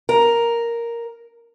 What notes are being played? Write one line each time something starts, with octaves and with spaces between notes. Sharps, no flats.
A#4